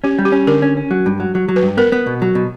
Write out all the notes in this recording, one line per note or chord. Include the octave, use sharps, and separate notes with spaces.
C#4 G4
G3
G4
C#4
D3 A#4
C#4
C#4
F#3
G2
F#3
F#3
F#3
B4
G2
B3 A#4
B3
B2
F#3
B2